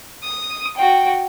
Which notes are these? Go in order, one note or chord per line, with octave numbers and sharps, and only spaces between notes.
D#6
F#4 G5